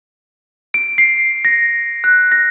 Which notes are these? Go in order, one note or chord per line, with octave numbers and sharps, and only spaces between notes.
D7
C7
A#6
F#6
A#6